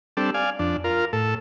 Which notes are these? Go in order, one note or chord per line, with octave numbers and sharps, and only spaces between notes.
G3 C4 D4 A4
D5 F5 G#5
F2 D4
F4 A#4
A2 A4